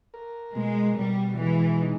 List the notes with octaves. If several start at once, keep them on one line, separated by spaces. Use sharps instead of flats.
A#4
B2 G#3
B2 G3
E3 G#3
D#4